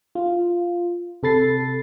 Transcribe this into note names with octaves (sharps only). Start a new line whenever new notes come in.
F4
C3 A4 B5 A6 C7